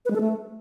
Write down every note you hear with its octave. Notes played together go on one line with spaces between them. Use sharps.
B4
G#3
A4
A3